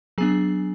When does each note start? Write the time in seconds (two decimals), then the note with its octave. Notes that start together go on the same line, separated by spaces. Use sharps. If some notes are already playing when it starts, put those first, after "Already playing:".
0.18 F#3 B3 D4 G#4 G#5